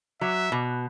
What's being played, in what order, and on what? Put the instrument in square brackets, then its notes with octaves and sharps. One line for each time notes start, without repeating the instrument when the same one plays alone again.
[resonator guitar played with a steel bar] F#3 [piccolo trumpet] E5
[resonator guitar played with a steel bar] B2